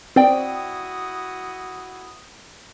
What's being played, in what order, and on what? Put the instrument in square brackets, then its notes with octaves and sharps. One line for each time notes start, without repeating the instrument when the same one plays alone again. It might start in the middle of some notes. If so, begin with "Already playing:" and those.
[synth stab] C4 [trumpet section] E4 F#4 D#6 [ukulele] D5 G5